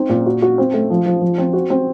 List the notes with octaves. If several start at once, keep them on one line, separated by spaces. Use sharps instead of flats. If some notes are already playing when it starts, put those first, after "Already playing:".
Already playing: C4 D#4
A#2
F#4
F#4
C4
A3
F3
F3
F3
C4
F#4
C4